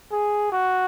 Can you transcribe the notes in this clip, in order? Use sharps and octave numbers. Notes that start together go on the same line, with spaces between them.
G#4
F#4